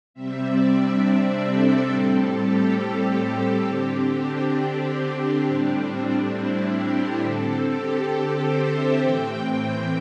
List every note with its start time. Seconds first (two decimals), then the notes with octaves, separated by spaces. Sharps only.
0.14 C3 G3 C4 E5
0.44 D5
0.73 D4
1.03 C4
1.47 A4
1.91 A2 G3 C4 A4
2.36 G4
2.80 G4
3.68 D3 C4 G4
4.13 D4
5.45 A2 G3 C4
6.33 E4
6.77 G4
7.22 D3 C4 A4
7.66 G4
8.10 A4
8.39 C5
8.69 E5
8.98 A2 E3 C4 G5